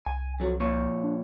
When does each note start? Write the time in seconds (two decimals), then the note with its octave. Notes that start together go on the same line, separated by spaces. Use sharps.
0.06 C2 G#5
0.40 F2 F#3
0.60 A#2 F3 C#5
1.04 D4